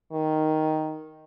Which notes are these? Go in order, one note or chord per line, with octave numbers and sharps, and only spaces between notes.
D#3